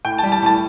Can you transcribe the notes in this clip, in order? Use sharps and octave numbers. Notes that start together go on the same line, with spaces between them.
A2 G5
A5
G3
A5
A2 A5